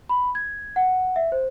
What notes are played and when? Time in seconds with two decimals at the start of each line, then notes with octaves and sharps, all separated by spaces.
0.09 B5
0.35 G#6
0.76 F#5
1.16 E5
1.32 C5